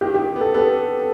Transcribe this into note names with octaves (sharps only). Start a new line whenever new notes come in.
D#3 G4
G4
D#3
B3 A4
B3 A4